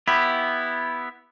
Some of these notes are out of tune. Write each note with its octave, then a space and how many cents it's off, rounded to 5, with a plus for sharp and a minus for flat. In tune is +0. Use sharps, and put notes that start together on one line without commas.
B3 +0 E4 +0 G4 +0